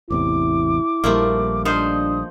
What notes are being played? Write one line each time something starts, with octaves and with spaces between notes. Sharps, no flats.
A1 E2 C3 E4 D6
A#1 F3 G3 A3 A#3
F3 D4 D#4 C5 D#6